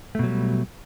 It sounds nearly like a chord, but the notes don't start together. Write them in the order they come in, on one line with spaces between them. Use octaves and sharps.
A3 B2 F#3 G3